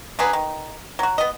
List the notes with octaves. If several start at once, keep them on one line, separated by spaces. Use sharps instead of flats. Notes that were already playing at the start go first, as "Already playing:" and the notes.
D3 F#3 G#4 B4
D#3
F#3 F#4
B3 D#5